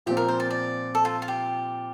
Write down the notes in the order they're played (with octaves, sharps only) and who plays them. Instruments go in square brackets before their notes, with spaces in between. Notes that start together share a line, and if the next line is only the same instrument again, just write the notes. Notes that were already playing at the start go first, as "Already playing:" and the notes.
[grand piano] A#2 F3 C4 [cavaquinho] G4
[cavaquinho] A#4
C5
D5
D5
A4
F4
F4
G4